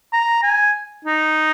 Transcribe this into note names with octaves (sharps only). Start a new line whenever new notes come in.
A#5
G#5
D#4